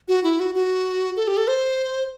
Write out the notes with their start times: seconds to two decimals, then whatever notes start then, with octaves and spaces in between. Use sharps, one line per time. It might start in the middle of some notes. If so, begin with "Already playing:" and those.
0.08 F#4
0.24 E4
0.40 F#4
0.55 F#4
1.17 A4
1.28 G4
1.37 A4
1.48 C5